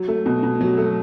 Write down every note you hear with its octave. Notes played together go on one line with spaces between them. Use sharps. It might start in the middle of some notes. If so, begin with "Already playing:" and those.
Already playing: F#3
A3
B2
B2
F#3
A3